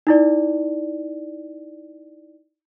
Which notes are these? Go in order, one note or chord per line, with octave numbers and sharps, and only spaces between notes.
D#4 E4 D5